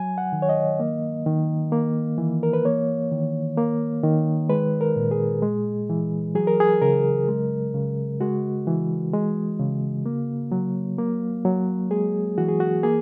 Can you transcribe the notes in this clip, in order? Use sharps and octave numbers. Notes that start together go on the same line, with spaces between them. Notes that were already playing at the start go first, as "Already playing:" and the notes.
Already playing: F#3 G#5
F#5
D#3
C#5
D#5
A#3
D#3
A#3
E3
A#4
B4
A#3 C#5
D#3
A#3
D#3
G#3 B4
A#4
A#2
G#4
G#3
E3
F#3 G#4
A#4
G#4
C#3 A#4
G#3
C#3
G#3 F#4
E3
G#3
C#3
A#3
F#3
A#3
F#3
G#3 G#4
E3 F#4
G#4
F#4
A#3 G#4